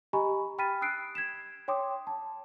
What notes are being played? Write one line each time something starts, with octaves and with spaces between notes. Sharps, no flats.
G4 D#5 G#5 A#5 B5 C#6
G5 B5 F6 A6 B6 D#7
D#6 E6 F#6 C7 D7
G#6 B6 E7
C#5 G5 C6 D6 D#6
A5